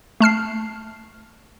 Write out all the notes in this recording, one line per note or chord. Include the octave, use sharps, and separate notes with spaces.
A3 A5 F6 C7